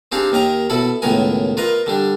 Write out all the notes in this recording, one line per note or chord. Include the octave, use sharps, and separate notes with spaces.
C4 D4 D#4 G4 G#4 F5
D#2 D#3 A#4 D#5 A#5
B2 E4 A4 B5
C#2 A2 D#3 B3 A#4 G#5
F4 A#4 B4 D#5
D3 G3 D4